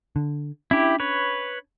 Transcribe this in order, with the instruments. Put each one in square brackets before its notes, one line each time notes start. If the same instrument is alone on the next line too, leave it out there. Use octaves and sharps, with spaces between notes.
[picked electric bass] D3
[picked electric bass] C#4 D4 [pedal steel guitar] E4 G4
[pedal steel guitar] B4 C#5